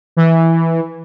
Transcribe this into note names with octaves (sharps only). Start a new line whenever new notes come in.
E3